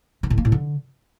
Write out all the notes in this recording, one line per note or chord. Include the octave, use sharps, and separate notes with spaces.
D#3
A2
A#3
A2
D3